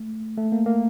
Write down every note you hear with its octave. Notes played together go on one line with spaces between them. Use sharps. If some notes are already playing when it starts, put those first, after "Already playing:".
Already playing: A3
A3
A#3
A#3